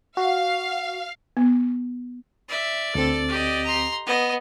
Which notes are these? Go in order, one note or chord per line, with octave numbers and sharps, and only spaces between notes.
F#4 F5
B3
D5 E5
D2 C4 A4
G4 D#5
A#5 C6
B3 D#5